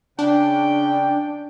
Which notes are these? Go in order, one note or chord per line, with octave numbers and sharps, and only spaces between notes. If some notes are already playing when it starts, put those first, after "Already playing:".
C#3 D4 G5